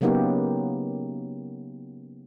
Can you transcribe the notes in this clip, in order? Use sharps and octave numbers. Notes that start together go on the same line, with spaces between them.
C#3 F#3 A#3 B3 D#4 G4